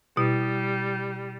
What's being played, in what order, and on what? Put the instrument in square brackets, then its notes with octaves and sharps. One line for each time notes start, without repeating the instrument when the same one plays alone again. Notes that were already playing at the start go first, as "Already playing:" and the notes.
[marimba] B2 E4 [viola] G3